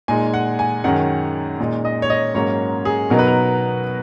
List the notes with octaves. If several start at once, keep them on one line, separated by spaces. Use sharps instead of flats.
A#2 G#3 D#4 G#5
F#5
G#5
F#2 D#3 G#3 C#4 F#5
A#2 G#3 D#4
D#5
C#5
D#5
G#2 F#3 A#3 C#4 C#5
G#4
B2 F#3 B3 D#4 A#4
B4
A#4